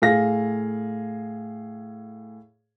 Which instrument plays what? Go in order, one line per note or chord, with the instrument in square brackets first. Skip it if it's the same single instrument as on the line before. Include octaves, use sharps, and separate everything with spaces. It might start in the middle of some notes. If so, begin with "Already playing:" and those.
[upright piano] A2 G#4 F5 A#6